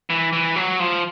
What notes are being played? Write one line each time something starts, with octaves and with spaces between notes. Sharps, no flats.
E3
E3
F#3
F3